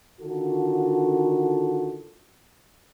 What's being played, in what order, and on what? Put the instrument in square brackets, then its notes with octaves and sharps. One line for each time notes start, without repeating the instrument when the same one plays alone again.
[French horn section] D3 D#3 F4 F#4 A4